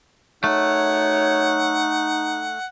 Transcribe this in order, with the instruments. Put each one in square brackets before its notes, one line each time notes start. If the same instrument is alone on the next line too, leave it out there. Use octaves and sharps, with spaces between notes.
[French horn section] F#2 F#3 C#5 [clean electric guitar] A3 [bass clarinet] D#4 [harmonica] F#5